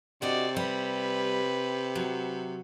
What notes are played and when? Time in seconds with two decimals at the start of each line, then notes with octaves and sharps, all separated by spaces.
0.22 C3 D4 F#4 D5 D#5
0.57 G3 B4
1.95 F#3